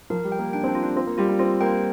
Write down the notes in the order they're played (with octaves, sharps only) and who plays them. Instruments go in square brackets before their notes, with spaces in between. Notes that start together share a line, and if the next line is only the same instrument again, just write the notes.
[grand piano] F3 [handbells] A#4
[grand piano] G3
[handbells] G5
[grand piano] A#3
[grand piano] D4 [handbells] G5
[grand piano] C4
D4
[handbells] F4
[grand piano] D4
[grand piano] C4 [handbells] F4
[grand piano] A#3
[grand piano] G3 [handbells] F4
[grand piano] G3
[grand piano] C4 [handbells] F4
[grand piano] A#3 [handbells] G5